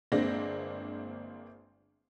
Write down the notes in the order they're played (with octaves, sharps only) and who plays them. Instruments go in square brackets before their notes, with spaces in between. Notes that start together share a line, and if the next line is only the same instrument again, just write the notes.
[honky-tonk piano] G1 G#3 A#3 C4 D4 A#6